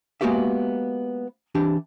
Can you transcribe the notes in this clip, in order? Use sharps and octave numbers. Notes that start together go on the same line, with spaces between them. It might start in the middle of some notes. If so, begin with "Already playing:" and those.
G#3 A#3 B3 F#4 G4 E5
E3 D4 G4